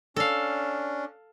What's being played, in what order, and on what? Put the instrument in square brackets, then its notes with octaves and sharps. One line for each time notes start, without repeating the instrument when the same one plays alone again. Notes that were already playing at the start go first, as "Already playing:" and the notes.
[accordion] C#4 D4 [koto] A4 F5